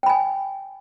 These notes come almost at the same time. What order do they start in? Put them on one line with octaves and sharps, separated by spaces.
G5 B5 G#5